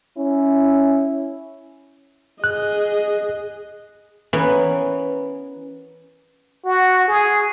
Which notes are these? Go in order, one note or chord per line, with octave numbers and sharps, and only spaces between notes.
C#4 E4
G#4 D#5 F#6
E3 B3 C#4 A#4
F#4
G#4